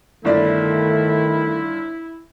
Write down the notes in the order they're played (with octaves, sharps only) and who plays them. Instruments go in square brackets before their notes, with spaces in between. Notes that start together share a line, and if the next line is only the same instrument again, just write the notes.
[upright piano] G1 D5 [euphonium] D#3 [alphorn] A3 [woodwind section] E4